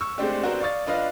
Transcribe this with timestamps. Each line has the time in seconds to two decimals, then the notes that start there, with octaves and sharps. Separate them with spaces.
0.01 C#6 E6
0.18 G#3 A3 C4 D4 G4
0.42 B3 C4 D4 F#4 A#4 C5
0.60 D5 F5 C#6 D#6 A6
0.87 D4 F4 B4 D#5 F5